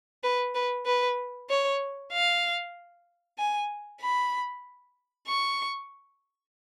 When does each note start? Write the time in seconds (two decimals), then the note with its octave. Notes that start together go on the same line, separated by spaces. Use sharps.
0.23 B4
0.55 B4
0.86 B4
1.49 C#5
2.12 F5
3.38 G#5
4.01 B5
5.27 C#6